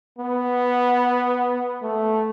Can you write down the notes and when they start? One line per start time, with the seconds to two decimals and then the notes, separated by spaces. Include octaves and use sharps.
0.19 B3
1.82 A3